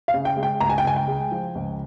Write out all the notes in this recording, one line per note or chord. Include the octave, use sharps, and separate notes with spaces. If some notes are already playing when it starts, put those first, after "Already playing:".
F5
C#3
G5
G#3
G5
C#2 A#5
G#5
G5
C#2 G#5
G5
G#3
F3
C#2